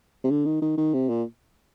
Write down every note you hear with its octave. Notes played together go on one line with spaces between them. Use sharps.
C3
D3
D#3
D#3
D#3
C3
A#2